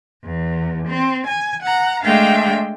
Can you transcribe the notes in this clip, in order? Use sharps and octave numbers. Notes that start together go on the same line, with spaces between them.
E2
C4
G#5
F#5 A#5
G#3 A3 D4 E5 F5 G5